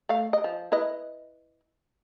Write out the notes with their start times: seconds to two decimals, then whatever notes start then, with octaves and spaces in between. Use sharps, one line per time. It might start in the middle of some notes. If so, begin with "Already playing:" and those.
0.09 A3 F5
0.33 D#5
0.44 F3
0.72 E4 B4 D#5